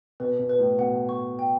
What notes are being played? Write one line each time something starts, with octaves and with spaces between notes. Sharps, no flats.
B2 B4
B2
B4
A2
B2 F#5
C#6
G5